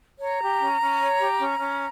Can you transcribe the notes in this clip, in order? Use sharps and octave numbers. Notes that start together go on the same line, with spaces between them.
C#5 A#5
G4
C#4
C#4
C#5
G4
C#4
C#4